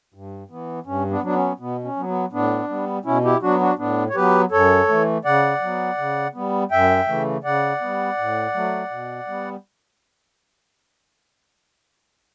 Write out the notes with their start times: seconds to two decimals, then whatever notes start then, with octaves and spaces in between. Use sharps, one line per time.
0.14 G2
0.50 E3 B3
0.86 G2 C#4
1.11 B3 D4
1.23 F#3 B3 D4
1.35 C#4
1.60 B2 B3
1.84 C#4
1.96 F#3 B3
2.08 B3
2.32 A2 B3 D4
2.69 G3 B3
3.05 B2 C#4 E4
3.24 E4 G4
3.42 F#3 B3 D4 F#4
3.61 D4 F#4
3.78 A2 B3 D4
4.10 C#5
4.15 F#3 B3 G4 B4
4.51 F#2 A4 C#5
4.88 E3 A3
5.25 C#3 D5 F#5
5.61 F#3 B3
5.98 C#3
6.34 G3 B3
6.71 F#2 E5 G5
7.08 C#3 E3 A3
7.44 C#3 D5 F#5
7.81 G3 B3
8.18 A2
8.54 F#3 A3
8.91 B2
9.27 G3 B3